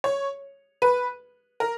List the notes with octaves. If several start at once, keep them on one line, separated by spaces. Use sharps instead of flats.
C#5
B4
A#4